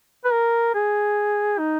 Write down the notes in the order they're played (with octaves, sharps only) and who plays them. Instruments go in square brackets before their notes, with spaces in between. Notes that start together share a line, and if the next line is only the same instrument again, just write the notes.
[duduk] B4
A#4
G#4
D#4